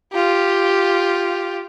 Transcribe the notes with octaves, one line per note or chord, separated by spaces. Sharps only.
F4 G4